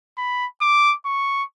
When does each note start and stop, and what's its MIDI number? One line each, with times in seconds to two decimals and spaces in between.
0.18 0.46 83
0.61 0.95 86
1.05 1.44 85